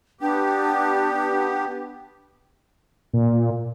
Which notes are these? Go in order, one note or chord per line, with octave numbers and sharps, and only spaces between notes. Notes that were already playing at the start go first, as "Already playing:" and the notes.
B3 D4 G4
A#2